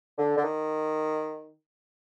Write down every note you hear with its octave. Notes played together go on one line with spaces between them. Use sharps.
D3
D3
D#3